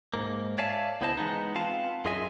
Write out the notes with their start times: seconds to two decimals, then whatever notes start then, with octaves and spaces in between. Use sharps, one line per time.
0.14 G#2 A#3
0.58 C#5 D5 E5 F5 G#5 A5
1.01 C#2 B3 E4 C5 D#5 A5
1.17 E3 G#3 B3 D#4
1.55 B3 C4 F4 F5 A5
2.05 F#2 F4 G#4 D#5 E5 G#5